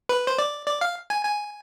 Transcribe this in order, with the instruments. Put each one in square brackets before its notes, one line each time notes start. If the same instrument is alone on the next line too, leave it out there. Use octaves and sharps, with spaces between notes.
[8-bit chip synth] B4
C5
D5
D5
F5
G#5
G#5